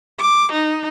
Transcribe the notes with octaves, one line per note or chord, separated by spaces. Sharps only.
D6
D#4